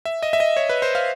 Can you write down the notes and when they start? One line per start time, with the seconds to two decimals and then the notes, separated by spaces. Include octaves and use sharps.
0.05 E5
0.23 D#5
0.33 E5
0.40 D#5
0.57 C#5
0.69 B4
0.82 C5
0.95 F5